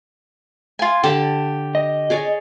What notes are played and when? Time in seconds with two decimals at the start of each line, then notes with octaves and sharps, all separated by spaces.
0.79 F4 G#5
1.04 D3 G4 A5 B5
1.75 D#5
2.10 G#4 C#5 D5